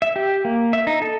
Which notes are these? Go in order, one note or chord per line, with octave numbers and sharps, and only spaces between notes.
E5
G4
A#3
E5
D#4
A4